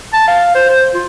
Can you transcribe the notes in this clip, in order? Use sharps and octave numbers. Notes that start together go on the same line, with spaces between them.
A5
F5
C5
C5
F4